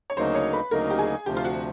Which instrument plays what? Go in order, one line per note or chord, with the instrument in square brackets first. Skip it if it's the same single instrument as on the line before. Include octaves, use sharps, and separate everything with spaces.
[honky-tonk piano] C#5
[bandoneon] D2 C#3 F#3 A#3 D#4 [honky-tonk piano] C5
[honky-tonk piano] C#5
B4
[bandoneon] D2 C#3 F#3 A#3 D#4 [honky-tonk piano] A#4
[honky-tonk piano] G4
G#4
[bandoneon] D2 C3 F3 [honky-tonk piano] G4
[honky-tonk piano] F4
F#4